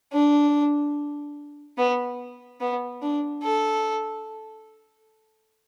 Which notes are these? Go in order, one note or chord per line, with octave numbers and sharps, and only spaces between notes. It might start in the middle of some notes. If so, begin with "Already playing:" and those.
D4
B3
B3
D4
A4